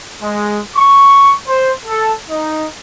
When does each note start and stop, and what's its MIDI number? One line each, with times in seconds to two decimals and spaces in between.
0.21 0.59 56
0.77 1.34 85
1.48 1.72 72
1.86 2.12 69
2.29 2.67 63